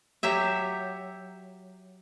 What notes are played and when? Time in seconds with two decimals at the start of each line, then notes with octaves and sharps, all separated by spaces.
0.23 F#3 G4 E5